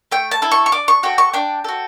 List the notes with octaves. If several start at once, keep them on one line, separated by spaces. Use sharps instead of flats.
A3 G5
A5
E4 A4
C#6
C#6
D4 D6
C#6
F#4 A4 G5
C#6
D4 G5
F#4 A4